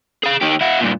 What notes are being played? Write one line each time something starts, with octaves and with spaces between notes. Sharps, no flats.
G#4 F5
D#3 G4
E4 F#4
G2 A#2